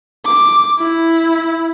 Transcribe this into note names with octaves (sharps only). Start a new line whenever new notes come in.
D6
E4